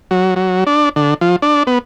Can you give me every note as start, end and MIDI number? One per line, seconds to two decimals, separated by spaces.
0.11 0.34 54
0.36 0.64 54
0.67 0.89 62
0.96 1.14 50
1.21 1.36 53
1.42 1.63 62
1.67 1.79 59